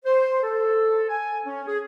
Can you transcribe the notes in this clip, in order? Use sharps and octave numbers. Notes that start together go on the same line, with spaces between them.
C5
A4
G#5
C#4
G#4